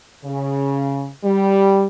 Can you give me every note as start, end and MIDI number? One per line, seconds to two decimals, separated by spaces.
0.25 1.09 49
1.24 1.87 55